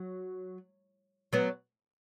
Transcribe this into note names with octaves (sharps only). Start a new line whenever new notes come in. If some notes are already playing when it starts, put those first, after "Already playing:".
Already playing: F#3
F#3 B3